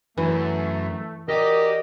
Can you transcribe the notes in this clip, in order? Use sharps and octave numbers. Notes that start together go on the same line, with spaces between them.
F#2 E3 A3
F#4 G4 A#4 D5 D#5